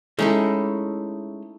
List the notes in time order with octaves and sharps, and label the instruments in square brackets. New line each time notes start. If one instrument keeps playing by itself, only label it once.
[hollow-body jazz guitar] G#3 C#4 [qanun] A3 D#4 E4